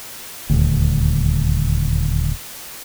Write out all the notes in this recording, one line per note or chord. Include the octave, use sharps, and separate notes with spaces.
D#1 D2